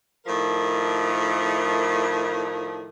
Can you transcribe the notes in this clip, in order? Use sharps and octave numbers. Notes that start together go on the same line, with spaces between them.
A2 D#3 F3 A#4